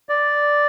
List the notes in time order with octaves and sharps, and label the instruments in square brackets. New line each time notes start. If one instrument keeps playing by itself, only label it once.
[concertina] D5